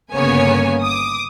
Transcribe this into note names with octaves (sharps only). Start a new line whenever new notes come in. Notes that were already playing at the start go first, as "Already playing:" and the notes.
G1 C#3 A#3 B3 C#5 G#5
D6 D#6